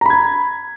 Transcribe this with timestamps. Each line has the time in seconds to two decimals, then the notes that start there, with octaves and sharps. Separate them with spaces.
0.01 A#5
0.06 B5
0.10 G#6